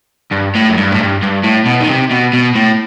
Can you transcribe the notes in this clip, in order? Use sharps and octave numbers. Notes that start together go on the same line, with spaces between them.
G2
A2
F#2
G2
A2
G2
G2
A2
B2
D#3
C3
B2
B2
A2